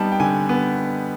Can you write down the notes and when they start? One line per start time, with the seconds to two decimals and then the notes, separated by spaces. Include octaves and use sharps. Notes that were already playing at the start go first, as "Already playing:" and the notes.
Already playing: G3 B3 D#4 A5
0.12 G5
0.20 D3 G#5
0.49 B3